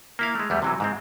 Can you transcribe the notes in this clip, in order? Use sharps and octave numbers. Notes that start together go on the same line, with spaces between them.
A#3 E4 F5
G#3 A3
E2 G3 A3
C3 E3 F#3
G#2 G#3 C4